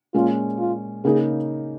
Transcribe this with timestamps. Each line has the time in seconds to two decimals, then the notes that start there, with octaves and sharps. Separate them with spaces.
0.14 A#2 G#3 C#4 F4
0.59 F4
1.04 C#3 A#3 D#4 G#4